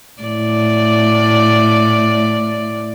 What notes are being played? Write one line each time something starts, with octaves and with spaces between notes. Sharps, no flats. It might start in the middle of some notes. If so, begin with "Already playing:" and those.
A2 D5